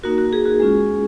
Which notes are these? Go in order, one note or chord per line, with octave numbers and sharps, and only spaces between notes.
A#3 D#4 F#4 A#4
F#4
G#4
F#4
G#3 C#4 F4 G#4